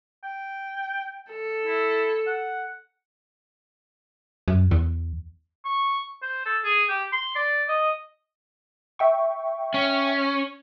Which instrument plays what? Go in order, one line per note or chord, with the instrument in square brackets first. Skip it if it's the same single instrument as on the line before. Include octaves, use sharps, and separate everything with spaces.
[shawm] G5
[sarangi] A4
[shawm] E4
F#5
[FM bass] F#2
E2
[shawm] C#6
C5
A4
G#4
G4
C6
D5
D#5
[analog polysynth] E5 G5 C#6
[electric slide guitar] C#4